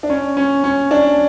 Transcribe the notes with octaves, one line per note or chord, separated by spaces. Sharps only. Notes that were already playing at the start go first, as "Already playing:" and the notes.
D4
C#4
C#4
C#4
D4